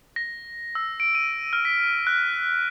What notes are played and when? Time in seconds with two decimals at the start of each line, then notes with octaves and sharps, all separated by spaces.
0.16 A#6
0.75 E6
1.00 D7
1.15 D#7
1.53 F6
1.65 B6
2.07 F#6